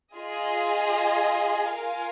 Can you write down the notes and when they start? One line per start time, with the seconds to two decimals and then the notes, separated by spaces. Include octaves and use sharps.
0.14 F4 G#4 D#5 G#5
1.69 F4 A#4 F5 G#5